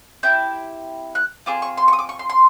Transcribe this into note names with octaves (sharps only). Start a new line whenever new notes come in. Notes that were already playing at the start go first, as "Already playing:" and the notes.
C4 E4 G4 G6
F#6
C4 F4 G#4 D6
C#6
C6
C#6
D#6
D6
C#6
C6
C6